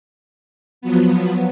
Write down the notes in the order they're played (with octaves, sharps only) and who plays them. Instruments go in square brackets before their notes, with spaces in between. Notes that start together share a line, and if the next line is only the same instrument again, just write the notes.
[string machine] F3 F#3 B3